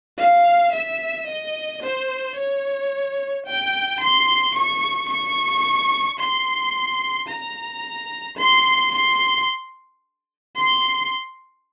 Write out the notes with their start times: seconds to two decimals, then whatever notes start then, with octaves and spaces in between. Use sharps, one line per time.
0.18 F5
0.72 E5
1.27 D#5
1.83 C5
2.36 C#5
3.46 G5
4.00 C6
4.55 C#6
5.09 C#6
6.19 C6
7.28 A#5
8.37 C6
8.92 C6
10.56 C6